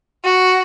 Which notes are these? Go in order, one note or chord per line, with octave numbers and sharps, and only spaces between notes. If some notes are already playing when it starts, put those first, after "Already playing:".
F#4